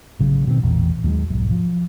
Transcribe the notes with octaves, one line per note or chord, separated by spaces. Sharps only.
A1 C#3 F#3
B2 D#3 F3 C4
A1 E2 A#2 E3
D#2 F#3 G#3
D#1 B1 G#2 F#3
F3